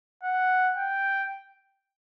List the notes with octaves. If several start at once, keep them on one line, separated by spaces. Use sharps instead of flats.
F#5
G5